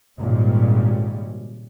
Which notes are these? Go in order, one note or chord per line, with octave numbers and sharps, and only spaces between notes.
G#1 A#2 C#3 G3 G#3